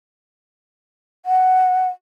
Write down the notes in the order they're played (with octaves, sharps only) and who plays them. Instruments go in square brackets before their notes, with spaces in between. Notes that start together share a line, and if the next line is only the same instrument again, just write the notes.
[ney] F#5